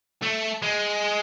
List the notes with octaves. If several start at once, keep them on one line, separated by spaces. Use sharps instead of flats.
A3
G#3